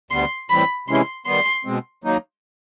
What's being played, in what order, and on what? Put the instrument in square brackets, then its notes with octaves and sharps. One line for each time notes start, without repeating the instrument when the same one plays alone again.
[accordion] D2 D3 G3 B3 [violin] C6
[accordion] A2 E3 G3 C4 [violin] B5
[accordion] C3 E3 G#3 C#4 E4 [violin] C6
[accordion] D#3 G3 B3 [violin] C6
[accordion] B2 G#3 C4
D#3 F#3 A#3 D#4